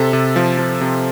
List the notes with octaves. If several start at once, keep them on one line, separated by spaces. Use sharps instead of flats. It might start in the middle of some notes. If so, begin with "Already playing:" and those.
Already playing: C3 A4
C3
F3
F3
C3